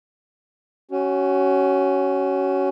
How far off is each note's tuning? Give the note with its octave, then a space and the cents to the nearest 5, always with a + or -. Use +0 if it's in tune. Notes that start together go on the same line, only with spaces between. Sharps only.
C#4 +5 F#4 +30